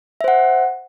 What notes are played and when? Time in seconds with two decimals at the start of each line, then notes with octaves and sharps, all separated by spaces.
0.21 E5
0.24 C5
0.28 F#5